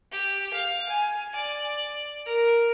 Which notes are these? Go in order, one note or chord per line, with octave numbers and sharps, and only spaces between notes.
G4
F5
G#5
D5
A#4